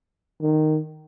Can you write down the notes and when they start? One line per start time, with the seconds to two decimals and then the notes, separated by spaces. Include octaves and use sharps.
0.41 D#3